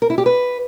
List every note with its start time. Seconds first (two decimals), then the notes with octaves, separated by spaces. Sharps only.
0.02 A#4
0.10 E4
0.18 G4
0.26 B4